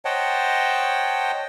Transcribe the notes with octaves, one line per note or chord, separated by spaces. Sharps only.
C5 C#5 D#5 F#5 G5 A5